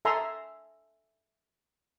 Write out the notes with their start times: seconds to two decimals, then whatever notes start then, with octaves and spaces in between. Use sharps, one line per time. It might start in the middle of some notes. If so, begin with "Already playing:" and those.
0.05 A4 E5 G#5 A#5 C6